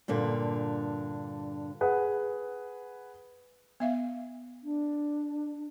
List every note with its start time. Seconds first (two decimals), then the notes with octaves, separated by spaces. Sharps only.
0.08 G2 A#2 D3 A#3
1.81 G#4 B4 F#5
3.80 B3 E5 F5
4.62 D4